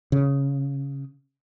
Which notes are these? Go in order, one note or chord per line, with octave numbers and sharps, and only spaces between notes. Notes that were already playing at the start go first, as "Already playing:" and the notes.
C#3